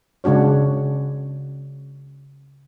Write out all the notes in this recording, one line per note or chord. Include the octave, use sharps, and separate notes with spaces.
C#3 G#3 D4 F#4 C#5